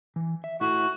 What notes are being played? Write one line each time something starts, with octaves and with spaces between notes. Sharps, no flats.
E3
E5
A3 E4 F#4 E5